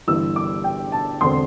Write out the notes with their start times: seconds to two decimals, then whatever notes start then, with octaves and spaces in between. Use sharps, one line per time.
0.07 G1 G2 E3 E6
0.36 D6
0.64 G5
0.92 A5
1.21 E1 D3 C4 C6